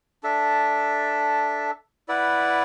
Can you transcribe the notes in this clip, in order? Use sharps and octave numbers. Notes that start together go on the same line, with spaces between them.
D4 A4 E5
E4 B4 D5 F#5